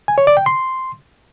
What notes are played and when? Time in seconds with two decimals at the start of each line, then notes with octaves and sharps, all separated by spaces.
0.08 G#5
0.18 C#5
0.27 D5
0.37 G5
0.46 C6